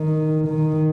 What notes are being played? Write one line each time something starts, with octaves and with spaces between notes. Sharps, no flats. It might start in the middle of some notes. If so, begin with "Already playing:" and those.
Already playing: D#3
D#3